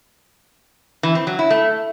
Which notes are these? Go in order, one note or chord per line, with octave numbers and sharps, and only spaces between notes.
E3
C4
F#3
E4
A3